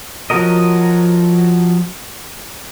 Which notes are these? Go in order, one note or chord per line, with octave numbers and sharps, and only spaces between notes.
F3 F#3 F#4 A#4 D#5